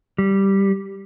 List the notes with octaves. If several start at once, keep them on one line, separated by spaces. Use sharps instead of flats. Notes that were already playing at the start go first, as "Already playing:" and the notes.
G3